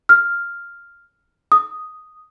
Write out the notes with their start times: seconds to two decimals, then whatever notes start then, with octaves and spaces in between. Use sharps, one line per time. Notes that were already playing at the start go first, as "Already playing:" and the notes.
0.09 F6
1.52 D#6